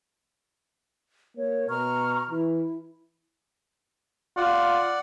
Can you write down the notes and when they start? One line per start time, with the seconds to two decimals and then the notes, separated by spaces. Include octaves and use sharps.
1.36 A#3 C#5
1.69 B2 A#5 C#6 F6
2.30 E3 E4
4.37 F4 D5 F#5